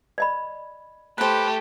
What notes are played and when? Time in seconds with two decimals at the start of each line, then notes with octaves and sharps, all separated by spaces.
0.18 D5 D#5 B5
1.18 A3 G4 B4 C5